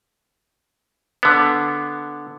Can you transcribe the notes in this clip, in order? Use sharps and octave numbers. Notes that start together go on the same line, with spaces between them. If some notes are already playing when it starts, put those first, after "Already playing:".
D3 B3